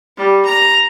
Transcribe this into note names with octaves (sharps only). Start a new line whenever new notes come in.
G3
A#5